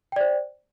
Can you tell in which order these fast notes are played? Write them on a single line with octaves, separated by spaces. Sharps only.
G5 D5 C5